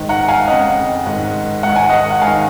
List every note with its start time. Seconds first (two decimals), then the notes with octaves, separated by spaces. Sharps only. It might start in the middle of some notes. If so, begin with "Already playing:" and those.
Already playing: G#2 D#3
0.09 F#5 A#5
0.28 F5 G#5
0.48 F2 C#3 D#5 F#5
1.06 G#2 D#3
1.63 G#2 D#3 F#5
1.76 G#5
1.89 D#5 F#5
2.10 F#5
2.21 G#2 D#3 F5 G#5